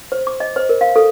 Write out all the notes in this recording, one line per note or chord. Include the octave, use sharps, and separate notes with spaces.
C5
D6
D#5
C5
A#4
F5
A4